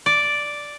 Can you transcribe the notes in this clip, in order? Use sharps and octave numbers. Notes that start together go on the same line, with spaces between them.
D5